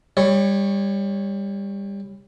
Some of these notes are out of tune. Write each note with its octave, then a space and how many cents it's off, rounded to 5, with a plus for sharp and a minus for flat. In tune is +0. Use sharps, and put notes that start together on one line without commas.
G3 +25 C#5 +0